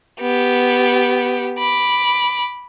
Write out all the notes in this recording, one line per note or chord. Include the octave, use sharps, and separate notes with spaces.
B3 G4
B5 D6